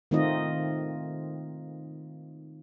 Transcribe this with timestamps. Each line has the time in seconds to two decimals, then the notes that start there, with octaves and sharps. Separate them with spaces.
0.11 D#3 A3 C4 D#4 F4 D#5